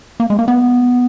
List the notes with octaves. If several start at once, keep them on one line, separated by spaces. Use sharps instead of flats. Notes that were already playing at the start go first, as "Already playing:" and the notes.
A#3
G#3
A#3
B3